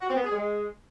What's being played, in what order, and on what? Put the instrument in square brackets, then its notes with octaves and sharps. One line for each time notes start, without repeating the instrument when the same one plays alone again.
[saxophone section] F#4
C4
B3
G#4
G#3